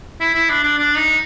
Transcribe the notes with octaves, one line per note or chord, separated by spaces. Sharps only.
E4
E4
D4
D4
D4
D#4